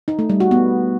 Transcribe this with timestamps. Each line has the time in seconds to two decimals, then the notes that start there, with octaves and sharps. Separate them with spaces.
0.08 D#4
0.19 A3
0.30 G3
0.40 F#4
0.51 B3